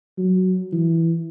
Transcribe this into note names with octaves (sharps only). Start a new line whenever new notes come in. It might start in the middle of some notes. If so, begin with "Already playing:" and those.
F#3
E3